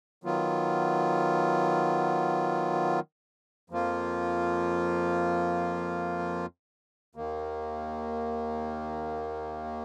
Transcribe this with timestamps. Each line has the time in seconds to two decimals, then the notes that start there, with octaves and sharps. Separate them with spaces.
0.24 D#3 F#3 B3 F4
3.70 F2 F3 A#3 F4
7.15 D#2 D#3 A#3